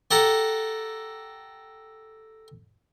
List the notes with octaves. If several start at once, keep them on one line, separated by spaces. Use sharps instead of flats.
G4 A4 F#5 A#5